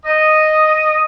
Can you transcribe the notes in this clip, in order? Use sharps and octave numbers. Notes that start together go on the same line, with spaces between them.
D#5